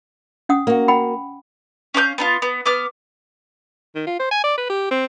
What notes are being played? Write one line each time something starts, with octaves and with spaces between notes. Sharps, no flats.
C#4 F#5 D#6
A#3 F#4
F#5 G5 B5
C#4 F5 D6 G6
B3 D4 F4
B3
B3 D6 F6
D#3
F4
C5
G#5
D5
B4
G4
C4